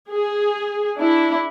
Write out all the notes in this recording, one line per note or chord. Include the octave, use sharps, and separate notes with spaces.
G#4
D4 E4